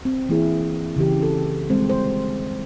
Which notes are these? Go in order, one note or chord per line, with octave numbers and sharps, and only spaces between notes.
C4
E3 A#3 E4 G#4
C#3 E3 G4
A4
D#3 G3 G#3 C4 C5
C5